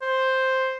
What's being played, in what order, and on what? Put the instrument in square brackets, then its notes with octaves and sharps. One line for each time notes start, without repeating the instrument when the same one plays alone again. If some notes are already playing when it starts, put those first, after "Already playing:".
[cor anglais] C5